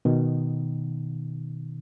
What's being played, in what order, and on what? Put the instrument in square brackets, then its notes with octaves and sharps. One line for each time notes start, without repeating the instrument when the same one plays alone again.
[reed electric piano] B2 D#3